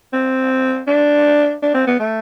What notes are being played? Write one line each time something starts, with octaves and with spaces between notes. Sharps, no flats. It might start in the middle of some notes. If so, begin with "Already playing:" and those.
C4
D4
D4
C4
B3
A3